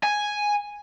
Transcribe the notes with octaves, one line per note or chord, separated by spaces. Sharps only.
G#5